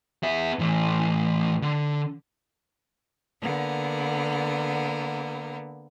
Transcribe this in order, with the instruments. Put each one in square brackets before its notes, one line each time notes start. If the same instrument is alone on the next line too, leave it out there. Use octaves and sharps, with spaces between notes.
[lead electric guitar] B3 E5
A2 E3
D3
[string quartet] D3 A#3 B3